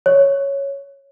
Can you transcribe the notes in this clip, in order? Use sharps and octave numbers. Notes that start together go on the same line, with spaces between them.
C#5